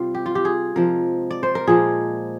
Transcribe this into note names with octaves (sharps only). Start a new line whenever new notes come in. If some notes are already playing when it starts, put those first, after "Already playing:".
Already playing: C3 G3 F4
G4
F4
G4
G#4
C3 F3 G#3 A#4
D5
C5
A#4
A#2 F3 G#3 G#4